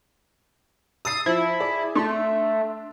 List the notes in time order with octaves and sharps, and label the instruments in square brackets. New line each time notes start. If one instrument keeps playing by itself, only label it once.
[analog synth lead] D#6 [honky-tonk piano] E6 A6 C7
[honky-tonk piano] F3 [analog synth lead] E4
[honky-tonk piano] G#4 D5
[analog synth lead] A3 [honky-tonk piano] D4 C6